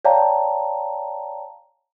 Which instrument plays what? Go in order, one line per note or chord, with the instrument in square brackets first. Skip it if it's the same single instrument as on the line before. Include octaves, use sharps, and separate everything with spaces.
[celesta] C#5 D5 F5 G5 A5 A#5